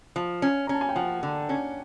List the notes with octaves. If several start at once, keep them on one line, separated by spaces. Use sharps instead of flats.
F3 F5
C#4
C#4 A#5
A5
G#5
G5
F3 F#5
D3
C#4